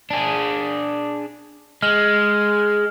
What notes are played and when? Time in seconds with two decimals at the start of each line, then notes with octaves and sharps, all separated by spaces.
0.10 D4 G#4
1.82 G#3 F6 F#7